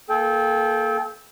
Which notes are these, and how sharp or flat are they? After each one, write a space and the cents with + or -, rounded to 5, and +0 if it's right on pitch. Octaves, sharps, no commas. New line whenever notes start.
A#3 +0 A4 -30 G5 +10